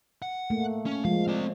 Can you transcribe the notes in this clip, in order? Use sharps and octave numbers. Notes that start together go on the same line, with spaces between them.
F#5
A3 A#3
C#4
F3 G#3 F5
C4 D5